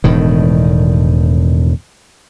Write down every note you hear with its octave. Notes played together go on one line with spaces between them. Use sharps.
E1 A2 D#3